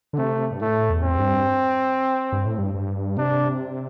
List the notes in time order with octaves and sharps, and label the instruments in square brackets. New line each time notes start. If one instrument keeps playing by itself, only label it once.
[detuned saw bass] D3
[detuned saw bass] C3 [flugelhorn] A3
[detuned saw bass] G2
[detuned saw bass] A2 [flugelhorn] A3
[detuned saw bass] E2
[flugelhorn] C4
[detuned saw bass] G2
G2
A2
G2
G2
[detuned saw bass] C3 [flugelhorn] D4